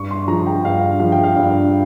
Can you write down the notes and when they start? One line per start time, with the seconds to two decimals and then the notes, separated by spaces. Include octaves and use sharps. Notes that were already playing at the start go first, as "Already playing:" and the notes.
Already playing: G2 C#6
0.11 C6
0.28 F3 A#5
0.47 G5
0.64 G2 F5
1.00 F3 F5
1.12 G5
1.23 F5
1.36 G2